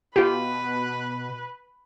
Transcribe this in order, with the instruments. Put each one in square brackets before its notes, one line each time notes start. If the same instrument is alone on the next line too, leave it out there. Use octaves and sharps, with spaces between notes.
[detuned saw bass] B2 [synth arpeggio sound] F4 G4 [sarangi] B4